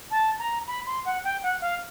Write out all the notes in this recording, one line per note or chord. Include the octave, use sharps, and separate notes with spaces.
A5
A#5
B5
C6
F#5
G5
F#5
F5